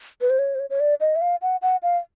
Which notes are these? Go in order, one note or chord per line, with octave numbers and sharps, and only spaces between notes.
B4
C5
C#5
C5
C#5
C#5
D5
D#5
E5
F5
F#5
F#5
F5